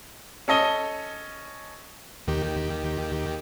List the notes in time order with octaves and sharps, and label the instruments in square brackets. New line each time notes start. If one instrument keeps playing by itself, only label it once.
[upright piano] C#4 A4 D#5 G7
[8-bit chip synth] D#2 D#3 G4